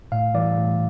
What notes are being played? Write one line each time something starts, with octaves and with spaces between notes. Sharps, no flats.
A2 F5
E3 G3 D5
A2